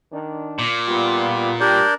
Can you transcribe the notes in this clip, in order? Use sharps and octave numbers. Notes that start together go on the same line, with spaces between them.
D#3 D4
A#2
G3 B3 F4
G3 D4 G4 A#4 D5 G6